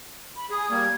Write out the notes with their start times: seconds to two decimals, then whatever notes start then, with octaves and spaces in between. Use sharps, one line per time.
0.36 B5
0.50 G#4 D#6
0.71 G3 A#3 G#6